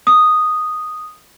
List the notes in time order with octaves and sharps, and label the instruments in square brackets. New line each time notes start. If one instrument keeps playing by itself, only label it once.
[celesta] D#6